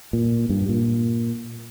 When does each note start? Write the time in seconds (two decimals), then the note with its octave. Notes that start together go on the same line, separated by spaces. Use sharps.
0.13 A#2
0.50 G2
0.69 A#2